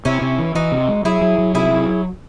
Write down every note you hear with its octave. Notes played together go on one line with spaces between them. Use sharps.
C3 C#4 E4
C3
E3
E3 D#4 F#4
C3
G#3
F#3 E4 G#4
F#3
F#3
C3 E4 G#4
F#3